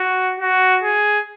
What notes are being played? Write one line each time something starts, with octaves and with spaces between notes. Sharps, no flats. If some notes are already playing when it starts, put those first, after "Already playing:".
Already playing: F#4
F#4
G#4